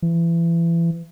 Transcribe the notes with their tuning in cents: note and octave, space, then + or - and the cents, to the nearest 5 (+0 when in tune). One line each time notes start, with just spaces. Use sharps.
E3 +30